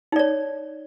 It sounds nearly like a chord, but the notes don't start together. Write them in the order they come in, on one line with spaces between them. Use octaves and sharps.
D#4 D5 C#5